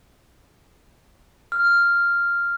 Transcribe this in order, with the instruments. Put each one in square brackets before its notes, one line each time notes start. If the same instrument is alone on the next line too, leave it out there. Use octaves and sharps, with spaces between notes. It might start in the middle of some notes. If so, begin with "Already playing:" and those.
[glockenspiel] F6